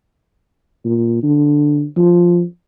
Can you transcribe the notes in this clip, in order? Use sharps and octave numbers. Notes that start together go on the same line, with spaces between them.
A#2
D3
F3